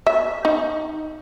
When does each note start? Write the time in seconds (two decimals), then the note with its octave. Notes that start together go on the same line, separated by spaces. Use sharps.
0.07 E5
0.45 D#4